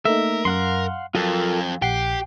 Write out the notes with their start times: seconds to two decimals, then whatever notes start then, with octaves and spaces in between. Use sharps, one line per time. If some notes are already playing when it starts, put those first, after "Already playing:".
0.05 A3 A#3 D#4 A#4 E5
0.45 F#2 F5 F#5 C6
1.15 F2 F#3 F4 A4 A#4
1.82 A#1 G4 F#5 G5 C7